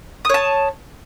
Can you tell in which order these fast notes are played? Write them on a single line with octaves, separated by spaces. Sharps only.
D#6 C#5 A5